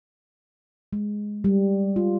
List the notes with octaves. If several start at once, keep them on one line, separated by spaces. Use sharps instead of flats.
G#3
G3
F4